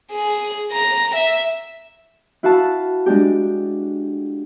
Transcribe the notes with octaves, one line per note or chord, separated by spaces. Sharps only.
G#4
A#5
E5
E4 F#4 F5 F#5 A5
G#3 D4 G4